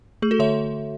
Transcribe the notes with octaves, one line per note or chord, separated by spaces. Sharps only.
A3 G#4
F#4 A4
D3 C#5 E5